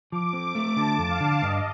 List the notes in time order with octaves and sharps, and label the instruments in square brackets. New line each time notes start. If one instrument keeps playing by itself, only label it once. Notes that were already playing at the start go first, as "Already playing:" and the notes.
[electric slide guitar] F3 [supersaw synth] D6
[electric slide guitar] C4
A3
[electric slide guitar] D3 [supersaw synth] A5
[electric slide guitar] F2
[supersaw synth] F5
[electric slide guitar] D3
[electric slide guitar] G2 [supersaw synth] D#5